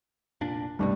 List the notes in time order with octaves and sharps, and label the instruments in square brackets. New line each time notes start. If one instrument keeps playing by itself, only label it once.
[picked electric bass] F1 A#2 D4
[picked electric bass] C2 G2 B2 [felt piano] G3 A3 D4